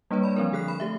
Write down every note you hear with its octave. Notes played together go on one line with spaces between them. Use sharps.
G3 A#3 D4 B4 C#5
D5 B5
F3 C4 D4 A#4
D3 G#4 A4 F#6 C7
B5
A3 G4 E5